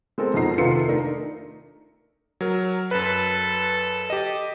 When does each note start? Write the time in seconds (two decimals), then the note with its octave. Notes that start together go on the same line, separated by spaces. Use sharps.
0.18 G#3 C4 A4 A#4
0.34 F2 B2 D#4 A#5 C7
0.58 C3 D#3 F4 A4 B4 C#7
0.88 A3 D4 D#4 A#4
2.41 F#3 A#4
2.91 F#2 A4 B4
4.10 G4 D#5